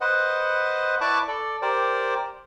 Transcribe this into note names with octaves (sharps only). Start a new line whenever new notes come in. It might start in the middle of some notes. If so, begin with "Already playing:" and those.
B4 C5 D#5 F#5
E4 B4 D5 A5 C#6 D6
A4 D5
G4 A#4 C5 D5